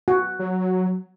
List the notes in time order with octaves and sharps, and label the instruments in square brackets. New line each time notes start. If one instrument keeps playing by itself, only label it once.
[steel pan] F#4
[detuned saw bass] F#3